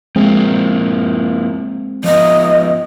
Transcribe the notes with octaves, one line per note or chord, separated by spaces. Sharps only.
F3 G#3 A#3 C4 E4
F3 B3 D#5